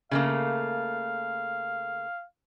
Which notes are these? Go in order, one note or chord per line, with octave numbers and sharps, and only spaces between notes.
C#3 A3 A#3 F5